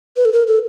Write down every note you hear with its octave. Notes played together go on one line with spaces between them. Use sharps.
B4
A4
A#4
A4